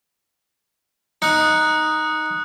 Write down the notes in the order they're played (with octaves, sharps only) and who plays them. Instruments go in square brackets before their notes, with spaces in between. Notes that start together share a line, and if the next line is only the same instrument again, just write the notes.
[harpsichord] D#4 [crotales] D#6 F#6 C#7